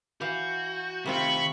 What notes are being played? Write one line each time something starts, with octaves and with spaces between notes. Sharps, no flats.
E3 F#4 F5 G6
C3 D#3 A3 C4 F4 B5 C#6